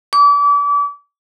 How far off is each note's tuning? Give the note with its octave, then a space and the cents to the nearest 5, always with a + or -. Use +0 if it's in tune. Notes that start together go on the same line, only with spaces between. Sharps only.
D6 -35